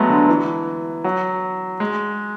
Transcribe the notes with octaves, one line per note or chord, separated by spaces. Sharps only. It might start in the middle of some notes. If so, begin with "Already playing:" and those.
Already playing: F#3 G#3 A3 B3
D3
E3
F#3
G#3